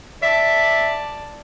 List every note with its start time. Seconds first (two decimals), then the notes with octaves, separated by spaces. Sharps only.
0.23 D5 E5 A5